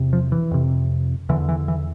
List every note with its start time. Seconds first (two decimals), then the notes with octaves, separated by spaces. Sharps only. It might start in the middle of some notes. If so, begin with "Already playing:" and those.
Already playing: E2 C3
0.13 F3
0.32 E3
0.51 F2 C3
1.29 E2 D3 E3
1.49 E3
1.68 E3